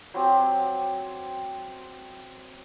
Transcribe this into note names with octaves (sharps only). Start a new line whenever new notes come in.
F#3 C4 G4